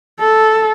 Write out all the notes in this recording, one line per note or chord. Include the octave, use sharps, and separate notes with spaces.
A4